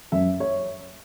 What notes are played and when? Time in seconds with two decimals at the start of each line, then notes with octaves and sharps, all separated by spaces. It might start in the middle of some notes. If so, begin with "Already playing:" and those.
0.12 F#2 E5
0.40 C#5